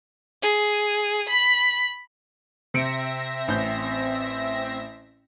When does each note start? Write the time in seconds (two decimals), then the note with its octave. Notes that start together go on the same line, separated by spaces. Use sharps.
0.43 G#4
1.29 B5
2.74 C3 C4 E5 A#6 C#7 D7
3.48 A1 G6